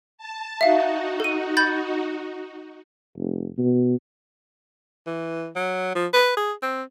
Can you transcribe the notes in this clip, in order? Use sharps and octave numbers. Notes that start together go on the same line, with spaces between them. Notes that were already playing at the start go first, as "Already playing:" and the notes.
A5
D#4 F#4 E5 F5
A4 D#7
B5 G6 A6
F1
B2
E3
F#3
F3
B4
G#4
C4